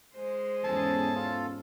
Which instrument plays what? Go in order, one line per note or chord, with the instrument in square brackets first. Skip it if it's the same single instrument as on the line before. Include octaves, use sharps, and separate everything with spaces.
[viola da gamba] G#3 C5
[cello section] E2 G#2 C#4 [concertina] G#4 A4 [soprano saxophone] A5
[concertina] F4 A4